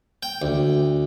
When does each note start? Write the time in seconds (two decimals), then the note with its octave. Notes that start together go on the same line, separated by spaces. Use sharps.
0.23 G5
0.42 D2